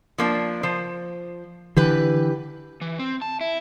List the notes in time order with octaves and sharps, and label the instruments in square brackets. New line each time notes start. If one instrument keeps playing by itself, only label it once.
[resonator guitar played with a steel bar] F3 A#3 D4
F3 C5
[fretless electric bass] D3 E3 [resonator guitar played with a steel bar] G4 B4
[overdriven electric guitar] E3
C4
A5
E4